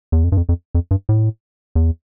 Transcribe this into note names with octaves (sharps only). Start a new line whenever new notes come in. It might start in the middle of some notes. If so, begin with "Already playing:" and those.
E2
F2
G2
F2
F2
F2
G2
A2
E2